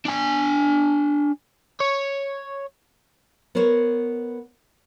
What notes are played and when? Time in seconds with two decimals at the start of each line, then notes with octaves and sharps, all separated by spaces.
0.06 D4 G#5
1.81 C#5
3.55 B3 A#4 C5 C#5